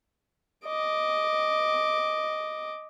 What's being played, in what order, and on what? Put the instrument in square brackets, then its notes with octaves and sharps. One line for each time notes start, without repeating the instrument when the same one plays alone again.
[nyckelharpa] D#5 D6